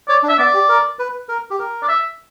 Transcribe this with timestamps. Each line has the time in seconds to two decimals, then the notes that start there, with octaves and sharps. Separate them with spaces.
0.08 C#5 D5
0.23 D4
0.29 E5
0.39 B3 D5
0.54 G4
0.69 A#4
0.99 B4
1.29 A#4
1.50 G4
1.59 A#4
1.83 D5
1.89 E5